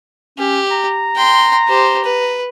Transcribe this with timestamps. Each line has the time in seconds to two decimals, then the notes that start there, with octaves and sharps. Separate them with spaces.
0.38 C#4 G4
0.71 A#5
1.16 G5 C6
1.68 G4 C5
2.04 B4